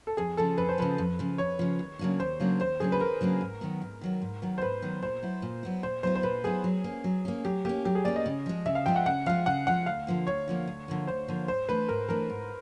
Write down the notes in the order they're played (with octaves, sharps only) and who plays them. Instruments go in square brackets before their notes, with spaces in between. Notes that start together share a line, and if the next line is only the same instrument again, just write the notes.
[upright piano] A4
[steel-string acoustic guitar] F2 [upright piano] G#4
[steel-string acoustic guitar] C#3 F3 [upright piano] A4
[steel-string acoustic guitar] F2 [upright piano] B4
[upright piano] C5
[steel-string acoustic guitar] C#3 F3 [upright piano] B4
[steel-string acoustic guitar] F2
C#3 F3
[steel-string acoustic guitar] F2 [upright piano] C#5
[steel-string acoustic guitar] C#3 F3
D#2
C#3 F#3 A#3 D4
[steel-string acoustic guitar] D#2 [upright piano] C5
[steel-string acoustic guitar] C#3 F#3 A#3 D4
[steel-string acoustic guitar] D#2 [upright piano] C5
[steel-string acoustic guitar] C#3 F#3 A#3 D4 [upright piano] G#4
[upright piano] B4
[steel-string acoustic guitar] D#2 [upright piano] A#4
[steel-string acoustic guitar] C#3 F#3 A#3 D4
G#2
D#3 F#3 B3
G#2
D#3 F#3 B3
G#2
D#3 F#3 B3
[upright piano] C5
[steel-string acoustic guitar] G#2 [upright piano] B4
[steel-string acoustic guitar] D#3 F#3 B3
[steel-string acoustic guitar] A#2 [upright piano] C5
[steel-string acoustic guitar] F#3 B3 E4
A#2
F#3 B3 E4
[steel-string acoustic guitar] A#2 [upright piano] C5
[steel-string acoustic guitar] F#3 B3 E4 [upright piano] C5
[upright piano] C5
[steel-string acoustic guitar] A#2 [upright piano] B4
[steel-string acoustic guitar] F#3 B3 E4 [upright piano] G#4
[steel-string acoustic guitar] F#3
A#3 C#4
F#3
A#3 C#4
[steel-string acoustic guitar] F#3 [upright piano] G4
[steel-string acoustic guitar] A#3 C#4 [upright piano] G4
[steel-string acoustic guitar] F#3 [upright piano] G4
[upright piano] G#4
[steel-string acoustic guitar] A#3 C#4 [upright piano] D5
[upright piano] D#5
[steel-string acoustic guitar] C#3
F3 G#3
[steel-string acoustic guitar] C#3 [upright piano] E5
[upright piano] F5
[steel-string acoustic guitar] F3 G#3 [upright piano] G5
[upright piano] F#5
[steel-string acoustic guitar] C#3 [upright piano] F#5
[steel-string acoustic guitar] F3 G#3 [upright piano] F5
[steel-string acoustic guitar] C#3 [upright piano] F#5
[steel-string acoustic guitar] F3 G#3 [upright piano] F#5
[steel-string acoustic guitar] D2 [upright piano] F5
[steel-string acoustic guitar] D3 F3 A#3
[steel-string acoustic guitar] D2 [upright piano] C#5
[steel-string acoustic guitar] D3 F3 A#3
D2
D3 F3 A#3
[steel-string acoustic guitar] D2 [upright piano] C5
[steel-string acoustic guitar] D3 F3 A#3
[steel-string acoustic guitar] G#2 [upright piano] C5
[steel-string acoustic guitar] E3 A3 D4 [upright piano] B4
[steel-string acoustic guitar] G#2 [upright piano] A#4
[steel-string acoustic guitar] E3 A3 D4 [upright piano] A#4
[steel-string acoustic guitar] G#2